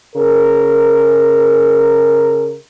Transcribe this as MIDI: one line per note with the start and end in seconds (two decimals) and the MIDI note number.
0.16 2.55 49
0.16 2.55 68
0.16 2.55 70